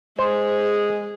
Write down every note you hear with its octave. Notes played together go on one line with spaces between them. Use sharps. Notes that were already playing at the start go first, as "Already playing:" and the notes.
G#3 G#4 C5